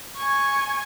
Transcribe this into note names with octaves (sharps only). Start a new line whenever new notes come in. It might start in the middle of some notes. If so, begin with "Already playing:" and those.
G#5 C#6